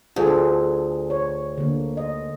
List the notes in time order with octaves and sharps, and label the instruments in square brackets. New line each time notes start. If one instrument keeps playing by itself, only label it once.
[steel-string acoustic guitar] D2 [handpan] F4 G#4 A4
[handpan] C#5
D3 A#3
D#5